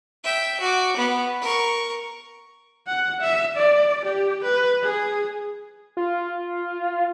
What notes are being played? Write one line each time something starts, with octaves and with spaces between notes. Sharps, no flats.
E5 G5
F#4 D6
B3
A#4 C#6
F#5
E5
D5
G4
B4
G#4
F4